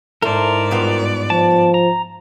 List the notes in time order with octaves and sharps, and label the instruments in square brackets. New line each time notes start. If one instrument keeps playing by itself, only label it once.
[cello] G#2 D5 [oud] E4 A4 [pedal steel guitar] A#4 C5
[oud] G2 B3 F4
[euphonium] F3 [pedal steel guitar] A5
[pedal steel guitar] A#5